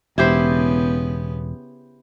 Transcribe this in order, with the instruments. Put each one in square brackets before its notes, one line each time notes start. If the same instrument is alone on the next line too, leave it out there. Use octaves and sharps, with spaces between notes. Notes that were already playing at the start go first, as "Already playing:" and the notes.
[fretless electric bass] E1 [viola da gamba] C#3 B3 [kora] E4 G4 C5